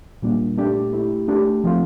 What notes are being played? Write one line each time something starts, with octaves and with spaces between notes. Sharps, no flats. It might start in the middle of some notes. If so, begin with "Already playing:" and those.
A#2 G3 A#3 D4
A#2 A3 D4 G4 D5
A3 E4 G4
A3 D4 G4
F3 A3 C4 F4